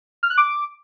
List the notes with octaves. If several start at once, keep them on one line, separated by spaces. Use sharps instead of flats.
F6
F#6
D6